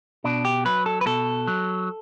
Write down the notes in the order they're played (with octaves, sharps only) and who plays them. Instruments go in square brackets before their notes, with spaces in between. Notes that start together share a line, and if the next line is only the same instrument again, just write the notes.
[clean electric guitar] B2 D4
G4
F#3 B4
A4
B4
B2 A4
F#3